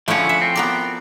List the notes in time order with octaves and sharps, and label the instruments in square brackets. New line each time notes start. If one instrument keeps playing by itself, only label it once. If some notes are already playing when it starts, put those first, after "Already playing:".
[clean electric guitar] D3 C#4 [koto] F3 E4 F#5 [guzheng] A3 C#5
[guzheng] E5
[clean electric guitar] C4
[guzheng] B3 A#4 D5